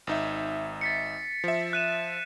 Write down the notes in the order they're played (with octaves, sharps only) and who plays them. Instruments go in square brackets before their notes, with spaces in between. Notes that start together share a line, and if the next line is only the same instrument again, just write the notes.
[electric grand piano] G#1 D#4 E5
[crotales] A6 B6 C#7
[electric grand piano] F3 E5
[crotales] F#6 D#7 E7